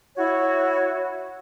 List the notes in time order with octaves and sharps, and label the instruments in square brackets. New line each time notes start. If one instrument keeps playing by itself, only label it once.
[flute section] E4 F#4 C#5